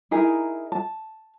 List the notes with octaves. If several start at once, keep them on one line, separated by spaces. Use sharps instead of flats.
D#4 E4 G#4 A#4
A5